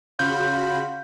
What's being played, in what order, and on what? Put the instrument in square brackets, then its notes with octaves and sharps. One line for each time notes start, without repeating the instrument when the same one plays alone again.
[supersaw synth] C#3 F#4 B5 [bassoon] F4 [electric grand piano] G6